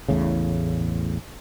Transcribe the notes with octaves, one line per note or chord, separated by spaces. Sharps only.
A1 E2 A2 C#3